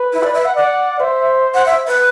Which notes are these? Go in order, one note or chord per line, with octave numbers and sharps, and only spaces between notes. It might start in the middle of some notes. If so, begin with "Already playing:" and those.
Already playing: B4
E4
D5
E5
F#5
D5 F#5
C5 E5
F#5
E5
B4